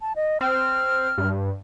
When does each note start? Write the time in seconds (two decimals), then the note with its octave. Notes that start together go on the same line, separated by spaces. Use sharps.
0.01 A5
0.16 D#5
0.41 C4 F6
1.18 G2